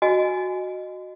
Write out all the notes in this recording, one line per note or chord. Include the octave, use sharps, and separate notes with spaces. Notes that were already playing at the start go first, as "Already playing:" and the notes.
F#4 D#5 G#5